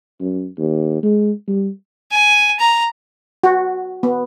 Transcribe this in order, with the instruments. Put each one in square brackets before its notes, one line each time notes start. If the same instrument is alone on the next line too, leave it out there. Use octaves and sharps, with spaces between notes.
[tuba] F#2
D#2
G#3
G3
[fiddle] G#5
A#5
[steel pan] F#4
B3